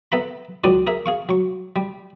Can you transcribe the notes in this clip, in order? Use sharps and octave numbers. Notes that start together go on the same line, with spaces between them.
B3 A4 E5 F#5 A#5 B5
C#2 D#3 F#3 F#4 D5 D#6
G#4 A#4 E5
G#4 F5 C#6
F#3 C#6
G3